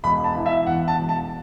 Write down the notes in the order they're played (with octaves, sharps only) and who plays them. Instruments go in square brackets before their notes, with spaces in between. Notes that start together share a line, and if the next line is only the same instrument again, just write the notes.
[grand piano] E1 B5
A5
E3
E5
E2 F#5
A5
E1
A5